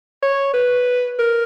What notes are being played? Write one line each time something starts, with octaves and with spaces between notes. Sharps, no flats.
C#5
B4
A#4